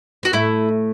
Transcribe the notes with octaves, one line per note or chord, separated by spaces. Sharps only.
B3 F#4
A2 A3 E4